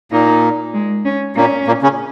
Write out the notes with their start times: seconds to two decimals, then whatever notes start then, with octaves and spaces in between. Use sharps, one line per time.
0.12 A#2 A#3 D#4
0.74 G#3
1.05 C#4
1.36 A#2 A#3 C#4
1.67 A#2 A#3
1.82 C#3 C#4